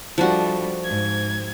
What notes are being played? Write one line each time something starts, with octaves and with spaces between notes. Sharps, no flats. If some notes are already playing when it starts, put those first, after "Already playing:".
F3 G3 A3 D4 F#4
G#2 G#6